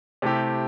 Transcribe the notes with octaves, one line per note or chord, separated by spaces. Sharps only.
C3 A3 E4 G4